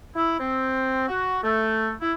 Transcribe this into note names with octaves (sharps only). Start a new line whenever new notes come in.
E4
C4
F#4
A3
E4